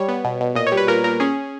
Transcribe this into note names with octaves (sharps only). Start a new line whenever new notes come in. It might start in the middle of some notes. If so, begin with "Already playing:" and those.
Already playing: G3 C#5
B3
B2
B2
A#2 D#5
C#5
G3
B4
A#2 A#4
A#2 A#4
C#4 G#4